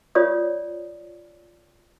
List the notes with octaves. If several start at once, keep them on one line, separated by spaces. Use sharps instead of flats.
F4 C#5 D5 D#6